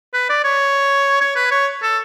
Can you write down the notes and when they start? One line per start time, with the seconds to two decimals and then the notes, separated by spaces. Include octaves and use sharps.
0.13 B4
0.29 D5
0.44 C#5
1.21 C#5
1.36 B4
1.51 C#5
1.82 A4